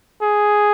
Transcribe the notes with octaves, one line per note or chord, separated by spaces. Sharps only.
G#4